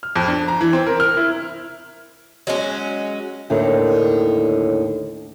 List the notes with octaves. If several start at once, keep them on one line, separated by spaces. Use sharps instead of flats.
F6
F2
D4
A#5
E3
C4
A#4
F6
E4
F#3 G#3 C#4
D#2 A2 D3 D#3